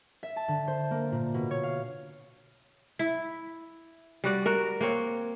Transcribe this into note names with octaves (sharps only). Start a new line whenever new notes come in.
E5
A5
D3
C5
A#3
A#2
B2
C#5
F5
E4
G3 F#4 D5
F#4 A#4
A#3 C4 C#5